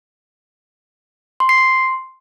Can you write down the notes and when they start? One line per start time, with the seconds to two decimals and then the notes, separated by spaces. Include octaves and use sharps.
1.40 C6
1.49 C7
1.58 C6